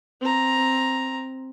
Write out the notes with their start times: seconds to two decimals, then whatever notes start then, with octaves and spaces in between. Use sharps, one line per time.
0.21 C4 A#5